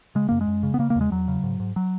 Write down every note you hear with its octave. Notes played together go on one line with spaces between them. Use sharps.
C#3 G#3
F#2 A#3
G#3
F#2
C#3
B3
C#3 A#3
A#3
E2
G#3
E2 F#3
C#3
G#2
G#2
F#3